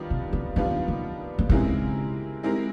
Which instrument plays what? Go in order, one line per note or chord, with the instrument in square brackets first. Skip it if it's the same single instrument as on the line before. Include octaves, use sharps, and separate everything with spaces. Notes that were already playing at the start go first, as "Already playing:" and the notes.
Already playing: [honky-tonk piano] D#3 G3 B3 D4 F4
[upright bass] C3
C#3
[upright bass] D3 [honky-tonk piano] D#3 G3 B3 D4 F4
[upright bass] C#3
D3
[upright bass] C#3 [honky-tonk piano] G#3 C4 E4 G4 A#4
[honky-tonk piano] G#3 C4 E4 G4 A#4